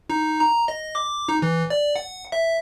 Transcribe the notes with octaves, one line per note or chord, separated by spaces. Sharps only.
D#4
A#5
D#5
D6
D#4
E3
D5
F#5
E5